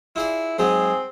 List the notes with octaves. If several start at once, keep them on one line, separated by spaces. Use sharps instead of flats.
E4 F4 G#4 D5
G#2 F#3 G#3 C4 G#4